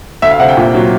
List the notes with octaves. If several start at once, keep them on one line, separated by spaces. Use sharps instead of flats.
D2 E5
F5
C3 F#5
G5
A#2
F#3